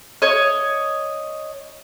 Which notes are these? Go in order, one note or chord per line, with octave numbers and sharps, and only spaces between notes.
C#5 D#5